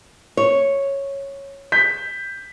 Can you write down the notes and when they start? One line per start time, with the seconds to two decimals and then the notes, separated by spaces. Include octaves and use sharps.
0.37 C#5
1.72 G6 B6